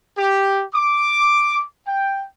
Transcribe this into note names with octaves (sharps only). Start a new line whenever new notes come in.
G4
D6
G5